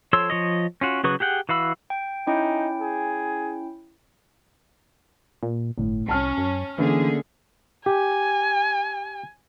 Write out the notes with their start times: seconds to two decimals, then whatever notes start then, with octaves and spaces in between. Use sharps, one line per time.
0.13 F3 A4 C#5 C6 E6
0.30 F3 C#5 D#5
0.81 C#4 F4 F#4
1.04 C#3 F#3 B4 C#6 D#6
1.20 G4 G#4 F#5 G5
1.49 E3 F#4 F5 B5 E6
1.90 G5
2.27 C#4 D#4 E4 G5
2.81 G#4
5.43 A#2
5.78 G1 A2
6.09 C2 C#4 A5 F6
6.38 F#2
6.78 D3 E3 A3 A#3 C#4 G#4
7.86 G4 G#5